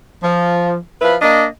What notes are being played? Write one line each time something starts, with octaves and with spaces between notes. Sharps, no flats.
F3
F3 E4 B4
A#3 D4 D#5